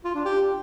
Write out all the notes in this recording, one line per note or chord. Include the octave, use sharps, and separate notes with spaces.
F4
D4
G4